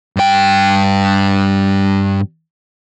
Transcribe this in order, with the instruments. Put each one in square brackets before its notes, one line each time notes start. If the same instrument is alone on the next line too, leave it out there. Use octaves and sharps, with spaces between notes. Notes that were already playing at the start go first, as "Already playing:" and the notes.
[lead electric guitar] G2 G5